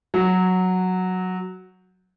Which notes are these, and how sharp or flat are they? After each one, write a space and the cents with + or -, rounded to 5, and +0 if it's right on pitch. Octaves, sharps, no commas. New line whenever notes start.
F#3 -5